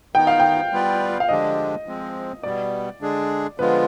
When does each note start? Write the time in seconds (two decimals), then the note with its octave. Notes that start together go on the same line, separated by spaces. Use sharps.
0.15 D#3 B3 D#4 G5
0.27 F5
0.40 G5
0.72 G3 B3 F4 B4 D5
1.20 F5
1.29 D3 F3 G#3 D4 G4 D#5
1.87 F3 G#3 C4
2.43 B2 G3 B3 D5
3.01 D3 G#3 D4 G#4
3.58 D3 F3 G#3 B3 F4 B4